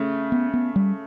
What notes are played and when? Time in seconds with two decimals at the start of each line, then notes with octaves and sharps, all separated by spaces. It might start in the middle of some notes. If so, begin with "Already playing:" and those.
Already playing: C#3 A3
0.32 B3
0.54 B3
0.76 G3